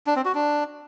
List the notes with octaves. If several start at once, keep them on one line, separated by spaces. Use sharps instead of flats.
D4
C4
F#4
D4